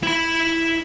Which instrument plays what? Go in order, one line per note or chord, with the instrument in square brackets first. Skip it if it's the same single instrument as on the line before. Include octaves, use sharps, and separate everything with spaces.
[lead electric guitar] E4 B5